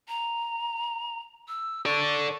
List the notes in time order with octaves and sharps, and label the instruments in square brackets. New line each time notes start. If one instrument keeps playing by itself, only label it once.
[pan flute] A#5
E6
[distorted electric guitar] A4 D5 [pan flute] C#6